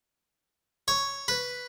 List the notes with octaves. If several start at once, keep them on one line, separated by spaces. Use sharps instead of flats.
C#5
B4